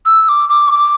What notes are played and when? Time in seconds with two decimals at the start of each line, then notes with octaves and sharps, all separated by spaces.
0.06 E6
0.29 D6
0.49 D6
0.68 C#6
0.72 D6